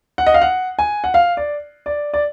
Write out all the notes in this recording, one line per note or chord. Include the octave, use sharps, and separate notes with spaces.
F#5
D#5
F5
F#5
G#5
F#5
F5
D5
D5
D5